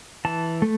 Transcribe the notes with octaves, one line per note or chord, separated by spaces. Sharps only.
E3 A5
A3